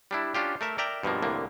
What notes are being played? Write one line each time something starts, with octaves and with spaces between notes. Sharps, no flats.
G3 D4 E4
C#4 D4 F4 G4
A3 A#4 E5
A#4 D5 E5 G5 A#5
G2 B2 F3 A#3
C2 A2 D3 A#3